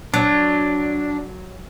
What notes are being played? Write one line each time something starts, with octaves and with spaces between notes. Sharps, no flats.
F#3 D4